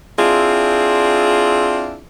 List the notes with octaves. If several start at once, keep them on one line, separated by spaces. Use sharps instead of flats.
C4 D4 E4 F4 G#4